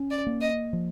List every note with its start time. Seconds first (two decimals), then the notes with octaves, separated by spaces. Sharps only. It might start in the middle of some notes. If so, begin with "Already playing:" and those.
Already playing: C#4
0.11 D5
0.27 A#3
0.41 D#5
0.73 F3